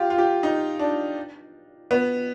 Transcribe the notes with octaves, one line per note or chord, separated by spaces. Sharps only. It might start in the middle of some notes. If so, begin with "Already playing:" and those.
Already playing: F4 G4
F4
G4
D#4
D4
B3